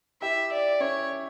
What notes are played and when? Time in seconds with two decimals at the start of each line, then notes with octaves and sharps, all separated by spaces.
0.22 E4 G4 E5
0.52 D5
0.80 C#4 E4 C#5